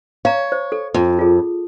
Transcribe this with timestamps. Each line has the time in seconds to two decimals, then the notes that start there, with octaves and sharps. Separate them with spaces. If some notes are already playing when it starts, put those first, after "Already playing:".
0.25 C#5 F5 A#5
0.52 C5
0.72 A4
0.94 F2
1.19 F4 G#4